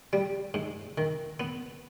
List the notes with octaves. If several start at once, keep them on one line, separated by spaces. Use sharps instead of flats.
G3
G#2
D#3
B3